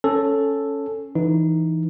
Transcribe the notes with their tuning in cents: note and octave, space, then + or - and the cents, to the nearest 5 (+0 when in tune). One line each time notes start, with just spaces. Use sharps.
C#4 +0 A4 +0
E3 +0 D#4 +0